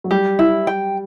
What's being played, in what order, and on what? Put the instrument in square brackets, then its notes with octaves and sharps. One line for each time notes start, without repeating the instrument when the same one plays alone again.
[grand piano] F#3
[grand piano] G3 [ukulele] G4
[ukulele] E4
G5